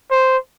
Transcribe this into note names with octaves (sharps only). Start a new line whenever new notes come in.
C5